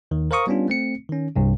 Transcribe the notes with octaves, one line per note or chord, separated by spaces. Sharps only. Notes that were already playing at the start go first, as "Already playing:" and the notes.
D#2 D#3
A#4 C5 F5 A#5 C#6 D#6
G3 B3 C#4 D4 F4
A3 C4 C#7
D#3 C#4
C2 G2 C3